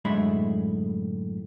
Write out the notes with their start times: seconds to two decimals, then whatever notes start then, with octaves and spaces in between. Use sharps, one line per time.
0.05 F#2 A2 D3 G#3 E5 B5